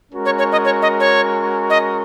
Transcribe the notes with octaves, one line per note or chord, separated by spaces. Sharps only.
G#3 C#4 F#4 A#4
C#5
C#5
D#5
C#5
D#5
C#5
D#5